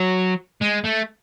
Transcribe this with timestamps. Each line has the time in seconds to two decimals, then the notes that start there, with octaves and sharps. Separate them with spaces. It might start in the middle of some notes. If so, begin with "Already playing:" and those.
Already playing: F#3
0.62 G#3
0.85 A3